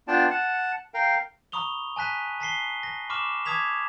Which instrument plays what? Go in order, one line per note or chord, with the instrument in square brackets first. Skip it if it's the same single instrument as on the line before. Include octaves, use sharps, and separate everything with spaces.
[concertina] B3 D4 F4 D5 G5 A5
F#5 A5
A#4 F5 G5
[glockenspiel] A#5 B5 C#6 D#6 F7 G7
G#5 A5 F#6 B6 D#7
A5 B6 C7 G7
A#6
B5 C#6 D6 F6 E7
A5 D6 D#6 G#6 B6 F7